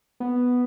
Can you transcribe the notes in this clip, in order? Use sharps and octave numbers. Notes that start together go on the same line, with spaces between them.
B3